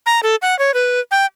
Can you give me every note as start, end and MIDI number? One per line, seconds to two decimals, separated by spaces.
0.06 0.20 82
0.23 0.36 69
0.42 0.57 78
0.59 0.74 73
0.74 1.00 71
1.11 1.26 79